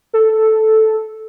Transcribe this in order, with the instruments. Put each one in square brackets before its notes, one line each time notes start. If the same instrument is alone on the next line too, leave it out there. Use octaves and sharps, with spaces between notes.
[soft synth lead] A4